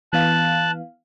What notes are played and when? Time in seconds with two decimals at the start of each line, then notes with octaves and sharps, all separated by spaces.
0.13 E3 B3 F5 A5 F#6